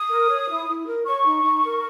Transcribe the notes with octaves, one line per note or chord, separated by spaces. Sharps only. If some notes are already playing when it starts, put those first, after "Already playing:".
Already playing: D#6
A#4
C#5
E4
E4
A#4
C#5 C#6
D#4
D#4
A#4